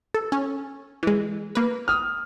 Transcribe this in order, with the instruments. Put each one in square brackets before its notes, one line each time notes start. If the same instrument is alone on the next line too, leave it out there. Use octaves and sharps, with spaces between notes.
[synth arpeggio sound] A4
C#4
E3 G#3
A#3 B4
[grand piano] D#6 F6